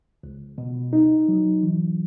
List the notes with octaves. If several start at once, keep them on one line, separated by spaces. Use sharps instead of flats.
C#2
B2
D#4
F#3
E3